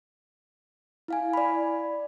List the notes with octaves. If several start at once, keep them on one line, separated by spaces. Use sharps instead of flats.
E4 F5 G#5
D5 B5